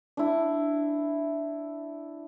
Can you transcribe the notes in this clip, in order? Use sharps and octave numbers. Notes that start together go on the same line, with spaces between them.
D4 E4